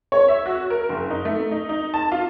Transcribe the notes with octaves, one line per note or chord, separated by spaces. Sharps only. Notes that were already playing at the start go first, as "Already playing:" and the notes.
C#5
E5
F#4
A#4
F#1
D#4
A3
D#4
D#4
A5
F4